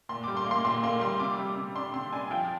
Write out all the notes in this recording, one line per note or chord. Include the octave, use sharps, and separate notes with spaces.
A#2 C6
D6
G3
C6
A#3 D6
C6
A#2 C6
A#3 C6
G3 C6
C3 D6
G3
C3
D4 C6
C3 C6
D4 G#5
F3 G5